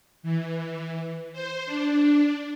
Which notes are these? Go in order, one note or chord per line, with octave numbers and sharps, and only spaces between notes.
E3
C5
D4